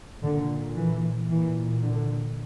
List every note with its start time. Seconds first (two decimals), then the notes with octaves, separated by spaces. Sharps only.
0.21 A#2 D3
0.75 E3
1.28 A#2 E3
1.83 D3